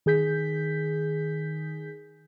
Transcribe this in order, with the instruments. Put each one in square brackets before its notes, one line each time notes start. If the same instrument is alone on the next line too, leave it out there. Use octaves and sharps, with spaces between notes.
[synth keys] D#3 G#4 G6 B6